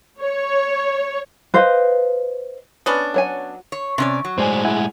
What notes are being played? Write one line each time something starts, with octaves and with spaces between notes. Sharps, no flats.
C#5
B4 C5 D#5 F5
B3 C#4 D4
F#3 C#5 G#5
C#5
C3 C#4 D5
F#3
A2 G#3 C5 D5 G#5
E4 F#5 G#5